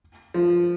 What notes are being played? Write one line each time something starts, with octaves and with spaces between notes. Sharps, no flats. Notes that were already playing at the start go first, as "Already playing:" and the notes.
F3